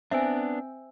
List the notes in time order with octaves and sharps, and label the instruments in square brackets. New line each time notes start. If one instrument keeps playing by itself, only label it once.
[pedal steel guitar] B3 D4 [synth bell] C4 C5 E6 [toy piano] E5 G#5